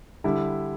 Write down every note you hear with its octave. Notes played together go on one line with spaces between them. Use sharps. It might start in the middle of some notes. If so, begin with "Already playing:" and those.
D3 G3 E4